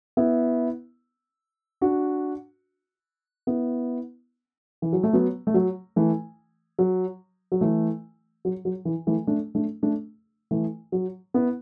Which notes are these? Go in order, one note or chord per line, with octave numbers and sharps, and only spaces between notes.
B3 E4
D4 F#4
B3 E4
E3
F#3
A3
F#3 B3
A3
F#3
E3 A3
F#3
F#3
E3 A3
F#3
F#3
E3
E3 A3
A3 D4
A3 D4
A3 D4
E3 A3
F#3
B3 E4